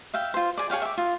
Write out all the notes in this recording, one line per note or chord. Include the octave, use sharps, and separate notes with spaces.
E5 F5 G5
F4 C5
G#4 D5
G#4 C#5 F5 G5
E5 D6
F4